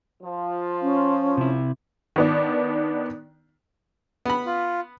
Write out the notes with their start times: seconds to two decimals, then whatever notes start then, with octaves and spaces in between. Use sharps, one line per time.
0.23 F3 F4
0.82 C#4
1.37 C3 E4
2.16 D#3 B3 D4
4.25 B3 B5
4.46 F4